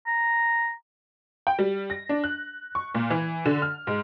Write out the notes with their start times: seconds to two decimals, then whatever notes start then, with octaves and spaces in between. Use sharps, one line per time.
0.07 A#5
1.47 G5
1.59 G3
1.90 A#6
2.09 D4
2.24 F#6
2.75 C#6
2.95 A#2
3.10 E3
3.45 D3
3.62 F6
3.87 G#2